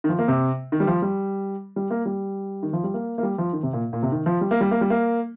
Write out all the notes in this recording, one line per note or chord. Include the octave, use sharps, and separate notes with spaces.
D#3
F3
A#3
C3
D#3
G3
F3
G3
G3
A#3
G3
D#3
F3
G3
A#3
A#3
G3
F3
D#3
C3
A#2
A#2
C3
D#3
F3
G3
A#3
G3
A#3
G3
A#3